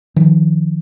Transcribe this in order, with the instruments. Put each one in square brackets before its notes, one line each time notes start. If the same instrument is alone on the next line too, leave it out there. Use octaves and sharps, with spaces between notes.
[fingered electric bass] D#3 F3